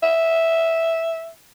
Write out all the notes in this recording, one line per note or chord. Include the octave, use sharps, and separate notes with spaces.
E5